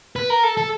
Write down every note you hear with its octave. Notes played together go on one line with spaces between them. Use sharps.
B4
A#4
A4
A4